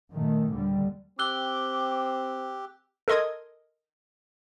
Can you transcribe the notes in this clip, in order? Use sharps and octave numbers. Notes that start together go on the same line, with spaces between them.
F#2 A#2 D#3 A3
D#2 D3 G3
C4 G4 D6 E6 F#6 G7
A4 A#4 D#5 C6 D#6 G#6